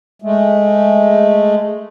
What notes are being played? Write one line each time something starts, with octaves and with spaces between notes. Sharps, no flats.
G#3 A3